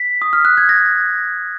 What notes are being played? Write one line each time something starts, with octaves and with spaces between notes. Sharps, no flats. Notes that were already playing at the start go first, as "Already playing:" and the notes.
Already playing: B6
D#6
F6
F#6
G#6
A#6